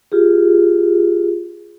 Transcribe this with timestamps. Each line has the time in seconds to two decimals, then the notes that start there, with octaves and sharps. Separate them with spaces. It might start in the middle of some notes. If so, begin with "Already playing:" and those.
0.12 F4 G4 G#4